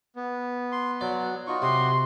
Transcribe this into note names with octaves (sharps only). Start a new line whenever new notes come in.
B3
C6
F#3 D5
D#4 F4 F#4 C#6
C3 F#4 G4 C#5 C6 D#6